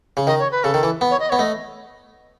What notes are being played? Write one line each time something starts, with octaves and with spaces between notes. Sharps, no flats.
C#3
D#3 D#5
C#5
B4
C#3 A4
D#3
E3
B3
C#5
D#5
B3 C#5
A3 D#5